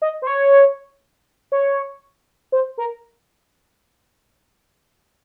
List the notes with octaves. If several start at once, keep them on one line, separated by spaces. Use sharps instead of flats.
D#5
C5
C#5
C#5
C5
A#4